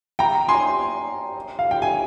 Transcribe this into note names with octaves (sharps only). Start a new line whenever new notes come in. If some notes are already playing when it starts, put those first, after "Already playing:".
G5 A#5
G#5 C6
F5
G5
G#5